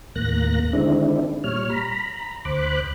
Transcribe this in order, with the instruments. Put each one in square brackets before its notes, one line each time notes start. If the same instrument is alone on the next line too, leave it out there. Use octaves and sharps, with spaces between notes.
[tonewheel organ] D#2 A2 A#3 F#6 A#6
D3 D#3 G#3 C4 D4 E4
A#2 G3 C#5 F6
A#5 B5
D2 C5 B5 D6 F#6